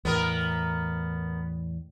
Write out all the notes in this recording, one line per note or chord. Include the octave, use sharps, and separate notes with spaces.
E2 A2 B3 A#4